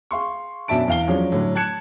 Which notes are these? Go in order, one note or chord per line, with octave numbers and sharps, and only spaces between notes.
G#4 F5 C6 C#6
F#2 B2 D4 E5 A5 D7
E2 F5 G7
F3 F#3 G#3 C#4 D4
A2 D3 F#3
A5 F#6 G#6 C#7 E7